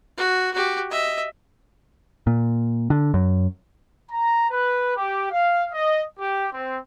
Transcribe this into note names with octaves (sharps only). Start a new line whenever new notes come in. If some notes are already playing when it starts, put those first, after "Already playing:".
F#4
F#4 G4
D#5 E5
A#2
D3
F#2
A#5
B4
G4
F5
D#5
G4
C4